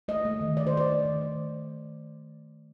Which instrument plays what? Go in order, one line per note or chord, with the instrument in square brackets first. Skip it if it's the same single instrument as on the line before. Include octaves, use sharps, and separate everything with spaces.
[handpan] A3 D#5
A3
D#3
D#3 D5
C5
A3 D5
A3
D#3
A3